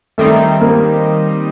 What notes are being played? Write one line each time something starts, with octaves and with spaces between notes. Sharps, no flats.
D#3 G3 A3 C4 D#4
A#3